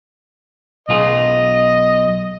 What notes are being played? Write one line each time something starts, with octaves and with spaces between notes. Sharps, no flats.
B1 F4 G#4 D#5